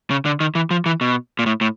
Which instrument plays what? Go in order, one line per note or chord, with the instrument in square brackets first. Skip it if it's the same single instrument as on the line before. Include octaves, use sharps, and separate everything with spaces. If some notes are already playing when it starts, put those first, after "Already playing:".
[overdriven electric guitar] C#3
D3
D#3
E3
F3
E3
B2
A#2
A2
A2